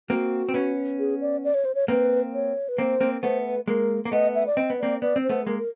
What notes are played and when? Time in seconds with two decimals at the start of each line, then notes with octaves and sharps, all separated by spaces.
0.10 A#3 C4 F#4
0.49 C4
0.54 B3 C#4
0.99 G#4
1.21 D5
1.44 D5
1.54 C#5
1.65 C5
1.75 C#5
1.88 A#3 C4 B4
2.34 C#5
2.69 B4
2.78 A#3 C4 C5
3.01 A#3 C4
3.23 A3 B3 C5
3.45 B4
3.68 G#3 A#3 A#4
4.05 A#3
4.12 A3 B3 D#5
4.35 E5
4.47 D5
4.57 C4 D#5
4.70 B3
4.79 A#3 C4 D5
5.02 B3 D5
5.16 C4
5.24 C5
5.29 A3 B3
5.47 G#3 A#3 A#4
5.59 A#4